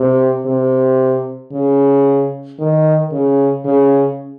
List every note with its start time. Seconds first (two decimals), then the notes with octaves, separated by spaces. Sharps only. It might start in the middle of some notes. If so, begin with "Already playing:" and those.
Already playing: C3
0.46 C3
1.52 C#3
2.59 D#3
3.12 C#3
3.65 C#3